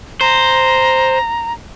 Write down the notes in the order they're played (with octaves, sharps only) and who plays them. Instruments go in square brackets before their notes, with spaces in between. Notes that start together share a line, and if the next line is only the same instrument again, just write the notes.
[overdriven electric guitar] C5 [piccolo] A#5